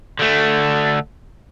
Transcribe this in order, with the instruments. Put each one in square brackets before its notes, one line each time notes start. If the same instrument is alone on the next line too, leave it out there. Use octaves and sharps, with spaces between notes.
[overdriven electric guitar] D3 A3